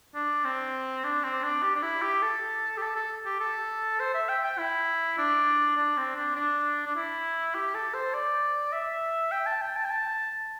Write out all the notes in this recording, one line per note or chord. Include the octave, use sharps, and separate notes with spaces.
D4
C4
D4
C4
D4
G4
D4
E4
G4
A4
G4
A4
A4
G4
A4
C5
E5
G5
G5
E4
D4
D4
C4
D4
D4
D4
E4
G4
A4
C5
D5
E5
G5
A5
G5
A5
G5
A5